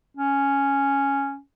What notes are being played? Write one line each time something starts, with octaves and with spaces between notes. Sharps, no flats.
C#4